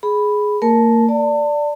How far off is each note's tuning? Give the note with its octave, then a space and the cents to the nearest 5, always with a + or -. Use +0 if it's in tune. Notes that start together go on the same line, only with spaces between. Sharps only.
G#4 +10 B5 +0
A#3 -35 A#4 +0 A5 -15
D5 +0 A5 +35